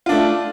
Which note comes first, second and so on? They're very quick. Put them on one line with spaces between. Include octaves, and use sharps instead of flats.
F4 D4 A3